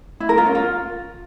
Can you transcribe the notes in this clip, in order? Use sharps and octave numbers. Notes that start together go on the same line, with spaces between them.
E4
A#4
F4
C#4
F4